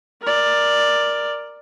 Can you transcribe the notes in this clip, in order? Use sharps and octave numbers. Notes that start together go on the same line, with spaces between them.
A#4 D5